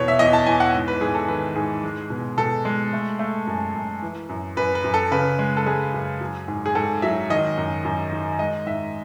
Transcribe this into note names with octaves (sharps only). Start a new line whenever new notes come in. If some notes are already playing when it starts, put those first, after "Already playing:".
Already playing: E2 B2 C#5
E5
E2 D#5
A5
E2 G#5
F#5
G#2
B4
G#2 G#4
A4
D#3 B4
G#2 G#4
G#3
B2
B2 A4
G#3
A3
A3
F#2
F#2
E3
F#2
F#2 B4
B4
F#2
A4
C#3 B4
G#3
A4
G#3 G#4
F#2
F#3
G#2
G#4
G#2 A4
F#3 E5
D#3 D#5
F#2
F#2
D#3
G#3 D#5
G#2 E5